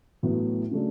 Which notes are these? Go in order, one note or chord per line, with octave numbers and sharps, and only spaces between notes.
A1 A2 F#3 B3 E4
C#3 F#3 A3 D4